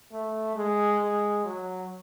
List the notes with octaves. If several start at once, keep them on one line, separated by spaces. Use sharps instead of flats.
A3
G#3
G#3
F#3